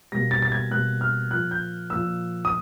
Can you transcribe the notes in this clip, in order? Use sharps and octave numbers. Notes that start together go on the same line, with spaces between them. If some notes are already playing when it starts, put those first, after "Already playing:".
B2 G3 A#3 A#6
A6
A6
G#6
B2 G3 A#3 F#6
F6
A#2 F3 A#3 F#6
G6
A#2 F3 A#3 E6
D#6